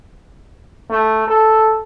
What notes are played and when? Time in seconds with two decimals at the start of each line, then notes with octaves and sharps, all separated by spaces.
0.90 A3
1.28 A4